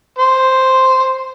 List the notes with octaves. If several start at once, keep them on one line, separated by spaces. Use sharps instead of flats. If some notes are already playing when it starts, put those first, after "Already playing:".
C5